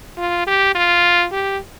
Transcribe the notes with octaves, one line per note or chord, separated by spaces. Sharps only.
F4
G4
F4
G4